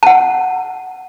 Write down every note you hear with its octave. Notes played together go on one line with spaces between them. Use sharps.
F#5 A5